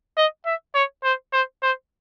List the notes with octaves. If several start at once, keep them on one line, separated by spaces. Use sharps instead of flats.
D#5
E5
C#5
C5
C5
C5